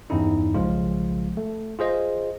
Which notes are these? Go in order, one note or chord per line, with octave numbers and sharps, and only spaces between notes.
E2 G2 C#4 D#4 E4
B1 C#3 F3 G#3 F4
A3
F4 G#4 C5 D#5